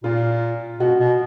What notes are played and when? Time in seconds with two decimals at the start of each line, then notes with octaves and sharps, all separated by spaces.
0.04 A#2 F4
0.80 B2 F#4
0.99 B2